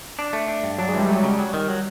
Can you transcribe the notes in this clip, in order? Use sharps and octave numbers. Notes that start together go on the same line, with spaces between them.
D4
A3
D4
G2
F#3 D4
G#3
E3
G3
F#3 A3
C#3 F#3
G3
F#3
D#3
F#3